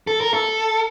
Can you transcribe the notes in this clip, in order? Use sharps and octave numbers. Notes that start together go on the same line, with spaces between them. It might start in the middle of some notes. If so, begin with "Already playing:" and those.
A4
A#4
A4